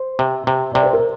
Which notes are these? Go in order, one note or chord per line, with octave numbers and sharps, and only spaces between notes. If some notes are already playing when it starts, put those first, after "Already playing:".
Already playing: C5
C3
C3
C3 D5
C5
A#4